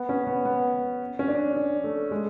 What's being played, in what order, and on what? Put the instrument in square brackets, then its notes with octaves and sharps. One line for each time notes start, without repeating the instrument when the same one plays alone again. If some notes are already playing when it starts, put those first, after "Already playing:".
Already playing: [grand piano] B3
C#4
B3
B3
C#4
D4
D4
A3
G#3